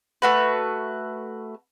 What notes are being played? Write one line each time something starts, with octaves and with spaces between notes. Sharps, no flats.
A3 F#4 B4